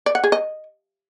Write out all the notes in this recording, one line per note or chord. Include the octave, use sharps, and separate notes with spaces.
D5
F#5
G#4
D#5